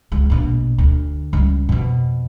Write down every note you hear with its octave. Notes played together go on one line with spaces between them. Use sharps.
C#2 G#3
A#1 B2
D2
C#2 G3
F2 B2